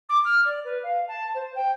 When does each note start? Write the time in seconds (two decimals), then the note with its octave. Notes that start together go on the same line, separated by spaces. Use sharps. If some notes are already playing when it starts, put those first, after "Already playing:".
0.09 D6
0.24 F6
0.44 D5
0.64 B4
0.83 F5
1.07 A5
1.34 C5
1.55 G5